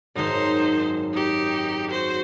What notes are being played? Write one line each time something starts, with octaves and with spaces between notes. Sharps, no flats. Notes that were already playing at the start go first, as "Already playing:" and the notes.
G#1 F#2 D#4 C5
D#4 G4
F#4 C5